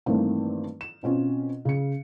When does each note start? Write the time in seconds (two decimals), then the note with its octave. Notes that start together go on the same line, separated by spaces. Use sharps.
0.06 G2 D#3 E3 A3 A#3 C4
0.81 E7
1.03 B2 C4 C#4 F4
1.65 C#3 C#7